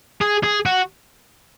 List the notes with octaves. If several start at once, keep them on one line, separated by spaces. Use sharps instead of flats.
G#4
G#4
F#4